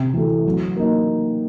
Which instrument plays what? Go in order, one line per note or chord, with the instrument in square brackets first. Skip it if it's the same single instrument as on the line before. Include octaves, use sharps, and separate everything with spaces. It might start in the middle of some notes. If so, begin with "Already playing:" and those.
Already playing: [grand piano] C3
E3 A3
F#3
A#3 D#4